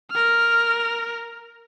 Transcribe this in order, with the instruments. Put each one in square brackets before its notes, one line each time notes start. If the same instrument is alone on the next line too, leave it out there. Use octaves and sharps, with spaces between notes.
[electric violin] A#4 F6